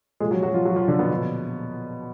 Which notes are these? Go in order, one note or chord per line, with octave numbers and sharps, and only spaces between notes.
A#2 F3 G#3 G#4
F#3 F#4
F#3 F#4
F3 F4
F#3 F#4
F3 F4
D3 D4
B2 B3
A#2 F3